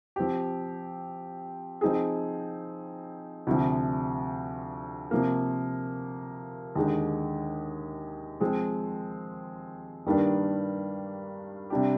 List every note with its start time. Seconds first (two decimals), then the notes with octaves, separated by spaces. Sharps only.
0.16 F3 C4 G4
1.81 F3 C4 D#4 G#4
3.47 D2 C3 F3
5.11 C3 F3 A#3
6.75 D#2 D3 G#3 D#4
8.40 F3 G#3 C4
10.06 G2 D#3 G3 A#3 D4
11.70 C3 G3 D4 G4